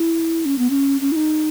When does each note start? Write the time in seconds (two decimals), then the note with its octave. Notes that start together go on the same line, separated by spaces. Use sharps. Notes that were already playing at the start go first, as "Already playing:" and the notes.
Already playing: E4
0.45 C#4
0.58 B3
0.70 C#4
1.01 C#4
1.12 E4
1.16 D#4